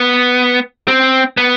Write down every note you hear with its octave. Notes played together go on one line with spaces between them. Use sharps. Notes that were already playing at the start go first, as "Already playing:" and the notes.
Already playing: B3
C4
B3